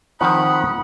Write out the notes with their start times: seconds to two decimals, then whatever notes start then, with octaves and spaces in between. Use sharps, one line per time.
0.21 D#3 F3 C4 F#5 B5 D#6